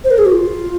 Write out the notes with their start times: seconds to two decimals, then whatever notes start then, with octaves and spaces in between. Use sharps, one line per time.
0.04 C5
0.11 A#4
0.18 G#4
0.26 F#4
0.32 F4